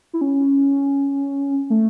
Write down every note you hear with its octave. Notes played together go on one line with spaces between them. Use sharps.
E4
C#4
A3